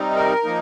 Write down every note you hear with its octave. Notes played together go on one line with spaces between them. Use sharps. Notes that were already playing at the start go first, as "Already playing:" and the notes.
Already playing: C3 G3 C4 D#4
A#4
F3 A#3 D#4